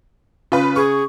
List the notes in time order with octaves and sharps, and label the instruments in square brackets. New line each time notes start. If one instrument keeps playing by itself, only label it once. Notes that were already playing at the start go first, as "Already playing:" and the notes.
[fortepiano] C#3 [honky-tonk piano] F4 B4
[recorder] G#4 [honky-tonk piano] C#6